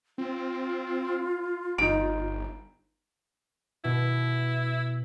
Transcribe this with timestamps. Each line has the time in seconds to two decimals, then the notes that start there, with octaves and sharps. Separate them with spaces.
0.18 C4 F4
1.78 G1 D#4 D7
3.84 B2 E4